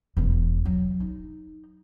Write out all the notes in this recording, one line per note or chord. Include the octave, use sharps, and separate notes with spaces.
E1 E2
F#3
D#4